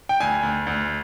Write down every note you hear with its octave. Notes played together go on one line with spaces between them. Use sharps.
G5
D2 G#5
D2
D2